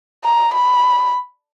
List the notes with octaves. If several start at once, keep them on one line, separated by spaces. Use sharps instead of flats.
A#5
B5